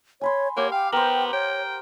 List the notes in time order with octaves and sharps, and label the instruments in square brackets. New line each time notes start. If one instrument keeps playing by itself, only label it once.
[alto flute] C#5 [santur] G#5 B5 C6
[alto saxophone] A#3 [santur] G4 F#5 [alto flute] C#5
[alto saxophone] F5 [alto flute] G5
[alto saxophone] B3 [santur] A#4 C5 [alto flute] G5
[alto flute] C#5 [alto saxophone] G5